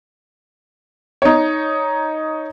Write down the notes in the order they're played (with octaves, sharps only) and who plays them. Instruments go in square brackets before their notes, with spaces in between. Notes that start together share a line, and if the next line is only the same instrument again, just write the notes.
[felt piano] D#4 C#5